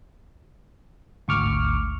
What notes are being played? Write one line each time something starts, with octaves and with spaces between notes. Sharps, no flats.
G#1 D2 C#6 D6 F6